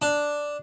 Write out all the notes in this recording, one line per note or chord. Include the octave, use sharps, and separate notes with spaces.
D4